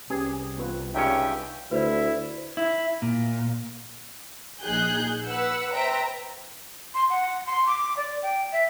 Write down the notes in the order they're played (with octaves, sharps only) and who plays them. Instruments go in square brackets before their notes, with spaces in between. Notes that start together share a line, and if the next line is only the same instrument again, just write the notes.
[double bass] C2 [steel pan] C#4 G4 B4 [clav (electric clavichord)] G#4
[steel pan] B3 F4 B4
[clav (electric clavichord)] C#2 G2 C#4 [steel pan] D#4 [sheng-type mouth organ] E5 G5
[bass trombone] D2 [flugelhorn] E4 [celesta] B4 C5 D5
[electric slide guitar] E4
A#2
[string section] A#1 D#4 G#4 F#6 G6
B4 F#5 E6
B4 C5 E5 G5 A#5
[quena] C6
F#5
C6
D6
D5
G5
E5